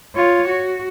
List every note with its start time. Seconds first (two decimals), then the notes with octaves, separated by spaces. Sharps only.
0.16 F4 C#5
0.48 F#4